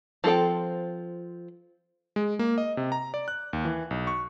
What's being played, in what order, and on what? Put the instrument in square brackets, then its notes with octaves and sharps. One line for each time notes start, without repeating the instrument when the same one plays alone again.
[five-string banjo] F3 C4 A4 G5
[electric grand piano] G#3
A#3
D#5
C3
A#5
D5
F#6
D#2
E3
B1
C#6